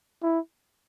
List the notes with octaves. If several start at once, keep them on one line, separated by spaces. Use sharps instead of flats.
E4